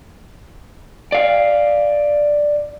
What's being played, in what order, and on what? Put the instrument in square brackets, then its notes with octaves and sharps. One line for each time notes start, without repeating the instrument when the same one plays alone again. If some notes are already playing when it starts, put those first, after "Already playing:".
[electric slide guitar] D5 F5